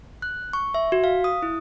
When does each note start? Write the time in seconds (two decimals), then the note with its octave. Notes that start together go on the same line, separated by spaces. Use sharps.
0.22 F#6
0.53 C#6
0.74 E5
0.92 F#4
1.04 F5
1.24 D#6
1.42 E4